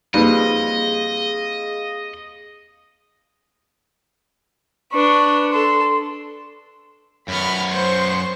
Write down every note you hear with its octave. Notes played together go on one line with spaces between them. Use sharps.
F2 G3 A#3 D#4 G#4 B4 D#5 F5
D4 B4 C#6
A4 C6
F#2 B3 B5 C#6 F6
C5 C6 C#6